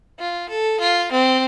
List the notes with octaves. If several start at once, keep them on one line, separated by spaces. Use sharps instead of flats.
F4
A4
F4
C4